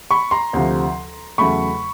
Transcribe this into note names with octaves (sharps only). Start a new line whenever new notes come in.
B5 C#6
A#5 C6
D2 C3 F3
E2 C#3 F#3 A3 B5 C#6